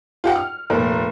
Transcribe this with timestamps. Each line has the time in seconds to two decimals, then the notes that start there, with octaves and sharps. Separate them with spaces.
0.24 F4 G4 F#5
0.36 F6
0.70 F1 A#2 A#4